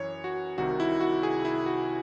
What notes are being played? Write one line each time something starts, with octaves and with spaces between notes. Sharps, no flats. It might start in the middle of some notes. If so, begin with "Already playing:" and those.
Already playing: F#2 E3 C#5
F#4
C2 C3 D#3 F#4
E4
F#4
G#4
E4
F#4